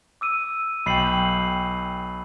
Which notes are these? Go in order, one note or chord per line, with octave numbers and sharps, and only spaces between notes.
D6 E6 D#7
B1 G5 B5 C7 F#7